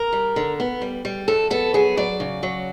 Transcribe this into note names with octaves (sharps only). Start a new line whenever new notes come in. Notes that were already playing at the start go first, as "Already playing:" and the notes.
Already playing: A#4
G3
D3
B3
G3
G3
F2 A4
B3 A4
F#3 G#4
F#3 D5
C#3
F#3